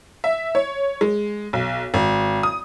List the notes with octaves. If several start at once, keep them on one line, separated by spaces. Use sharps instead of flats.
E5
C#5
G#3
B1
G#1
D#6